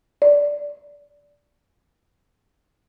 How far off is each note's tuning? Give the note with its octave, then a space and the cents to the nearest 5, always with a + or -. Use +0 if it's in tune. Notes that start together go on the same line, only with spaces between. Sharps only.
D5 -10